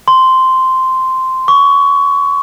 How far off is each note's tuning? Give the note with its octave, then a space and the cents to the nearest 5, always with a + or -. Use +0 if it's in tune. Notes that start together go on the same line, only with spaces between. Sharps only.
C6 -5
C#6 +20